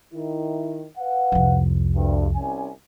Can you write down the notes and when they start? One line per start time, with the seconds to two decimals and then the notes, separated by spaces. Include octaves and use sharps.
0.13 D#3 E4
0.98 B4 F5 F#5
1.32 C2 F2
1.96 D2 G2
2.34 C2 C#4 G#5